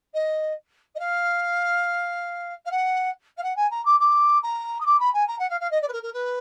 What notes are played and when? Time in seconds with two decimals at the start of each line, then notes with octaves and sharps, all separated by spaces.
0.14 D#5
0.95 D#5
0.99 F5
2.65 F5
2.71 F#5
3.37 F5
3.43 F#5
3.56 G#5
3.70 A#5
3.85 D6
4.00 D6
4.42 A#5
4.80 D#6
4.86 D6
4.99 B5
5.13 G#5
5.27 A#5
5.39 F#5
5.50 F5
5.60 F5
5.71 D#5
5.82 D5
5.88 B4
5.92 A#4
6.02 A#4
6.13 B4